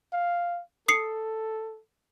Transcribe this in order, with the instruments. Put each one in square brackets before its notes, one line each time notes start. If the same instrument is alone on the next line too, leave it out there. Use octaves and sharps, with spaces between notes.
[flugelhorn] F5
[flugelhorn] A4 [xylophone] D#6 C7 C#7